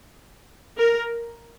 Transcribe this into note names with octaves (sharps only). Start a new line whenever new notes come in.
A#4